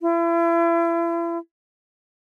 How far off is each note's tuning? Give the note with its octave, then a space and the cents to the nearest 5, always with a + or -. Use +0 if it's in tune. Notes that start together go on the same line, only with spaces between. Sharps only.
E4 +40